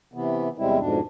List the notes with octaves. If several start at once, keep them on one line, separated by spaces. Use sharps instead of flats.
C3 E3 B3
E2 C3 G3 G#3 C4 E4
F2 G#2 B2 D4